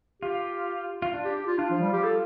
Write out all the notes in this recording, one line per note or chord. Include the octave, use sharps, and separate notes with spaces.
F4 G4
F4
D4
G4
G4
F4
D4 F4
F3
G3
G4
A4